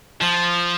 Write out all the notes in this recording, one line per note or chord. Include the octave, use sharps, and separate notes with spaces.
F3